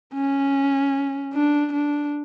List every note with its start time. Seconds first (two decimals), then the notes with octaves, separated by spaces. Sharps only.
0.14 C#4
1.33 D4
1.73 D4